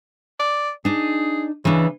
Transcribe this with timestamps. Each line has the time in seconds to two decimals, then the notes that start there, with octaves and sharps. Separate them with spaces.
0.40 D5
0.85 D4 D#4 G#4
1.65 C#3 E3 D4